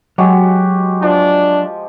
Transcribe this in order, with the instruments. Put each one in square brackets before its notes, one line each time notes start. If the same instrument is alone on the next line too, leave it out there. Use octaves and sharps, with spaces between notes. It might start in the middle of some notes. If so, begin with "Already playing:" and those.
[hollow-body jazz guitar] F#3 [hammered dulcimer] G#3 F#4 G4
[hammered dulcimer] F3 [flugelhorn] D4